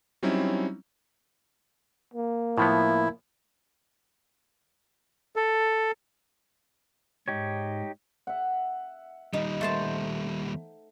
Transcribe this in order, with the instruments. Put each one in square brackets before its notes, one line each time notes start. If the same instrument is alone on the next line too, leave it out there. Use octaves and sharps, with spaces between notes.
[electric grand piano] F#3 G3 C4 C#4 D#4 E4
[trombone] A#3
[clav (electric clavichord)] A2 F3 B3 [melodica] E4
[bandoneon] A4
[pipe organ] G#2 [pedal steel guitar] D#4 G4 C#5
[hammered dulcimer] E5 F#5
[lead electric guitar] D#2 G3 [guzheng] D#4
[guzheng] A3 C5 A5